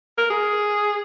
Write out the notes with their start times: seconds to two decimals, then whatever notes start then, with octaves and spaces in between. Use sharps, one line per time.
0.18 A#4
0.30 G#4